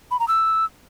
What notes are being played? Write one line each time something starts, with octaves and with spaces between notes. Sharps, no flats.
B5
A#5
E6